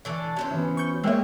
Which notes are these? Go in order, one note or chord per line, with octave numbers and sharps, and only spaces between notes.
D3 E3 A4 C#6
F#3 C#4 C5
E3 B3
C#6 G6
G#3 A#3 C5 C#5 E5 G5 E6